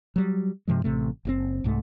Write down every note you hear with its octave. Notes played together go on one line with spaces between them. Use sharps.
F#3 G3
G2 C3 F3 G#3
A1 C3 A3
F#1 A2 C4
C2 G#2 A3